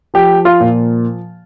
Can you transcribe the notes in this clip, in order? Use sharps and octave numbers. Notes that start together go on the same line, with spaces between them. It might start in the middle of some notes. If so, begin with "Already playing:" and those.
F3 G4
F4
A#2